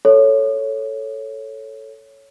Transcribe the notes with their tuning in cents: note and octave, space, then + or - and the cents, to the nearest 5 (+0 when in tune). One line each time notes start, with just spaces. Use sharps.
A4 +0 C#5 +0